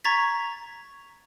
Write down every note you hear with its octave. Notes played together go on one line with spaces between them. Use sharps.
A#5 C#6 G#6 A6 B6